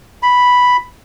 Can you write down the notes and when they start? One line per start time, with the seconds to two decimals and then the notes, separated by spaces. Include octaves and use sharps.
0.23 B5